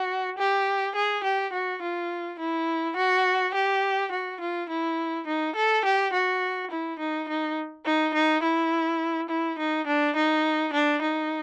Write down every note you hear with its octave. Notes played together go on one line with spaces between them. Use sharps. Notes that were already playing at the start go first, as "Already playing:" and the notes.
Already playing: F#4
G4
G#4
G4
F#4
F4
E4
F#4
G4
F#4
F4
E4
D#4
A4
G4
F#4
E4
D#4
D#4
D#4
D#4
E4
E4
D#4
D4
D#4
D4
D#4